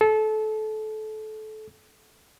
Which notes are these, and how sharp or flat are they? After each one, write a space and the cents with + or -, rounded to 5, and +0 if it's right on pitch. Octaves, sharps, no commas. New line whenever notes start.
A4 -25